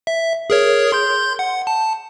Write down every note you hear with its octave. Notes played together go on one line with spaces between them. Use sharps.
E5
G#4 A#4 C#5
C6 G6
F#5
A5